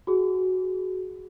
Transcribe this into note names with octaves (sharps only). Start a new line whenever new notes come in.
F#4 G#4